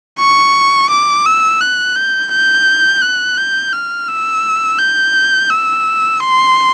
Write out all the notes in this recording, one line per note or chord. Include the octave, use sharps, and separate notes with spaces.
C#6
D6
E6
F#6
G6
G6
F#6
G6
F6
E6
G6
E6
C6